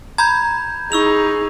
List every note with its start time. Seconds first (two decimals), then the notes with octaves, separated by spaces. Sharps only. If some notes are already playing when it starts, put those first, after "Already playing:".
0.18 A#5 B5 G6 G#6
0.92 D#4 G#4 C#6 E6 F7